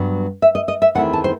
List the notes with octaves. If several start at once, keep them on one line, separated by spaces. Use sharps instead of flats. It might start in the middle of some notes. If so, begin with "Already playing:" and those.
Already playing: G2 F#3 B3
E5
D#5
D#5
E5
E2 D#3 A3 C4 E4 F#5
A5
C5